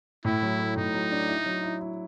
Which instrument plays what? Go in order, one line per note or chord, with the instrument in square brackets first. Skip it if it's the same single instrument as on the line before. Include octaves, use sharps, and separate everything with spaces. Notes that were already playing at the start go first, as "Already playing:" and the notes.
[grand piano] A2 [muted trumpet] E4
[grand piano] F#3
A3
[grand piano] A2 [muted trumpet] D#4
[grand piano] F#3
D4
E4
F#3
E4
E4